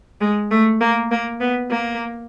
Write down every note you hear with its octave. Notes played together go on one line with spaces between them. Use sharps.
G#3
A3
A#3
A#3
B3
A#3